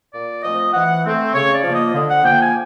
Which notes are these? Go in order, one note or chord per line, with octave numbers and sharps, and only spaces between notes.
A#2 D5
F3 A3 C4 D#5
E3 F#5
A3 C4
C#3 C#5
D5
F3
A#3 D#5
D3
F#5
F3 A#3 G5
G#5